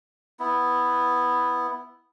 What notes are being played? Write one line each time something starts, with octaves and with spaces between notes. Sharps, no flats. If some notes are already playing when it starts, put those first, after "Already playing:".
B3 E4